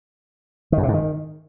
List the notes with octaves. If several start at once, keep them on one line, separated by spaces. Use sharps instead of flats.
D#3
F#2
C3
G#2
D#3